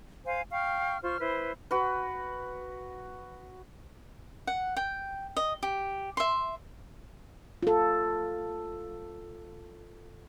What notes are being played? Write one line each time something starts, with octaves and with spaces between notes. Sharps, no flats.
C5 F5 G#5
F5 G5 C#6 F6
F4 C5 C#6 F6
E4 B4 C5
F#4 B4
F#5
G5
D#5
G4
E5 C6
F4 A4